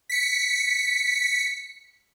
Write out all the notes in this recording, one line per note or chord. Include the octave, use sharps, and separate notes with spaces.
B6 C#7